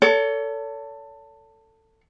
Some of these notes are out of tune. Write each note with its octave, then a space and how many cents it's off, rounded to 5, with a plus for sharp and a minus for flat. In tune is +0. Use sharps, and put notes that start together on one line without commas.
A4 +20 C#5 +40